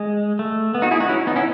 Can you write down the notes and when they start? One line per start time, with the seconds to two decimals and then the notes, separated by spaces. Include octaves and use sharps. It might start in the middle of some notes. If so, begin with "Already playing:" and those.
Already playing: G#3
0.39 A3
0.74 B3
0.82 D#4 F#4
0.91 E4 G#4
1.00 D#4 F#4
1.09 C#4 E4
1.27 B3 D#4
1.36 C#4 E4